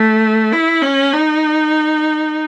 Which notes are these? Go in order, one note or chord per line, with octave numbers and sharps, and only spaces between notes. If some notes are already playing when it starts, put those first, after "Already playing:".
Already playing: A3
E4
C#4
D#4